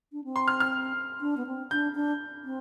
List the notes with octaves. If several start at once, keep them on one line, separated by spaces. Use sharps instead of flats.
D4
C4
C6
F6
F6
D4
B3
C4
D4 G6
D4
C4